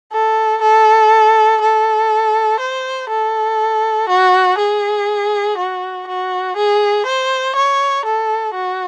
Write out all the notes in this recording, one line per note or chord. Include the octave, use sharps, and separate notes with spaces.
A4
A4
A4
C5
A4
F#4
G#4
F#4
F#4
G#4
C5
C#5
A4
F#4